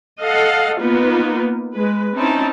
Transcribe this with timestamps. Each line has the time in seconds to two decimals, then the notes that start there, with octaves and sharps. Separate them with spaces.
0.20 A4 D#5 F5 F#5
0.80 A#3 B3 D#4 F4 B4
1.74 G#3 B4
2.15 C4 C#4 D#4 E4 A5